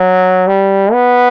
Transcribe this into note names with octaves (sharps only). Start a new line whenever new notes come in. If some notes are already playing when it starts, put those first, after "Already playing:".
Already playing: F#3
G3
B3